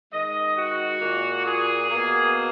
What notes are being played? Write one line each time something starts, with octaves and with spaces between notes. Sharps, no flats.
D#3 G#3 D#5
F#4
A#2 A#3
G#4
B2 A#3